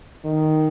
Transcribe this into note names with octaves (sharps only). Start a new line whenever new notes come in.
D#3